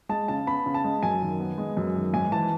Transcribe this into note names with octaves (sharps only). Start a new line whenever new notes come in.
G#3 A5
C#3 A5
B3 B5
C#3
A5
G#3
F#2 G#5
D#3
B3
G#3
F#2
D#3
G#2 G#5
E3 A5